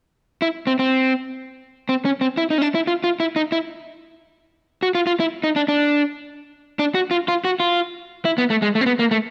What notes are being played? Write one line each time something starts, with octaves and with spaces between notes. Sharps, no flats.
E4
C4
C4
C4
C#4
C4
E4
D#4
C#4
D4
E4
F4
F4
E4
D#4
E4
F#4
F4
F4
E4
D#4
D4
D4
D4
F#4
F4
F4
F#4
F4
E4
B3
A3
G#3
A3
C4
B3
A#3
A3